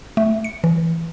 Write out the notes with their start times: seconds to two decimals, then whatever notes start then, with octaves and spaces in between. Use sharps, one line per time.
0.17 A3
0.44 C#7
0.64 E3